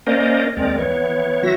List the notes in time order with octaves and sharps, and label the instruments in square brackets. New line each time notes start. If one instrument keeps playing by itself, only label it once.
[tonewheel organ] A#3 C#4 A#4 C5 D5 D#5
D#2 G#3 C4 A#4 D5
E3 B3 C#5
F#3 E4 F#4 E5 A#6